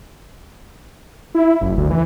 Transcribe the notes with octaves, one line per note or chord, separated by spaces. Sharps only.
E4
F#1
D2
E3